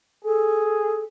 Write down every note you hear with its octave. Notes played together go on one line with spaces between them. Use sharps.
G#4 A4